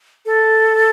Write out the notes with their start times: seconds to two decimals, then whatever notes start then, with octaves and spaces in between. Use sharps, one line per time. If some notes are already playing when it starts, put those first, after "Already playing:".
0.26 A4